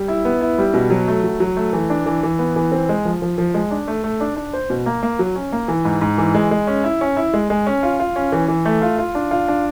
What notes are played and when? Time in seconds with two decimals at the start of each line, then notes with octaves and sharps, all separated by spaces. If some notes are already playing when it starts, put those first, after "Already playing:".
Already playing: G3
0.08 E4
0.25 B3
0.41 E4
0.58 G3
0.74 B2
0.90 F#3
1.08 A3
1.24 F#3
1.40 F#3
1.57 A3
1.73 E3
1.90 D4
2.06 E3
2.23 E3
2.39 B3
2.56 E3
2.72 C4
2.89 G#3
3.05 F3
3.22 F3
3.38 F3
3.54 G#3
3.71 D4
3.88 A3
4.04 A3
4.21 D4
4.36 D4
4.53 C5
4.70 B2
4.86 A#3
5.03 A#3
5.19 F#3
5.35 C#4
5.52 A#3
5.68 E3
5.85 G#2
6.02 G#2
6.18 E3
6.35 G#3
6.51 G#3
6.67 C#4
6.84 E4
7.01 C#4
7.17 E4
7.34 G#3
7.50 G#3
7.67 C#4
7.83 F4
8.00 F4
8.16 C#4
8.32 E3
8.48 E3
8.65 A3
8.82 F4
8.98 F4
9.15 D4
9.31 F4
9.48 D4